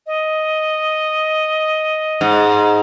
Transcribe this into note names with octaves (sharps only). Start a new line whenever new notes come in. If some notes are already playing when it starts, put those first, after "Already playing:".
D#5
G#2